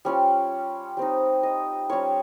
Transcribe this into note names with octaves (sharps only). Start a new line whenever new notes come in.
G3 C#4 F4
G3 C4 D#4
D#5
G3 C#4 F4 C#5